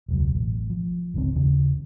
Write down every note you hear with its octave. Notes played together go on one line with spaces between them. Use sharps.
E1 C#2 F#3
A1
F3
G1 C#2 D#3 C4
D#2 C#3